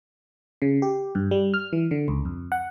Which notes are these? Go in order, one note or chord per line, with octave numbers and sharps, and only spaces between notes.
C#3
G4
G2
G3
F6
E3
D3
C#2
F2
F#5